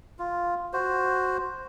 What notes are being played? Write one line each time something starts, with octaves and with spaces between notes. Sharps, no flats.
F4
F#4 C5